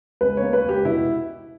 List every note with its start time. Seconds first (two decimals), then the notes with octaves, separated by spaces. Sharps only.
0.21 C#2 B4
0.37 A#3 C#5
0.53 B4
0.64 C#2
0.69 G4
0.85 B2 E4